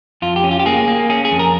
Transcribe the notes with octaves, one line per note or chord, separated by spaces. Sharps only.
F2 F4
G4
C#4
F4
G4
A#3 G#4
A#3
C#4 G#4
G#4
F2
A#4